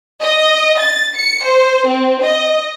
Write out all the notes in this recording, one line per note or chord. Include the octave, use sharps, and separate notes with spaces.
D#5
A6
C#7
C5
C4
D#5